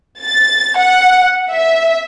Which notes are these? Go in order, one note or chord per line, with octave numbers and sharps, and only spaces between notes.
A6
F#5
E5